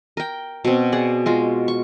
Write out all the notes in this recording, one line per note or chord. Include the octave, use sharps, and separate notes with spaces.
A#4 G5
B2 C4
G#4 D5 F#5
G#3 F4 F#4
C#6